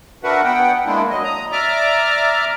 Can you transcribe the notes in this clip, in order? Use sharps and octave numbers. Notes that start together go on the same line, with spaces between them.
D4 F#4 A#4 B4 E5 F#5
B3 F#5 G5
G#3 A#3 D4 E4
F#3 D#5
A#5 D#6
D5 E5 A#5 D6 F6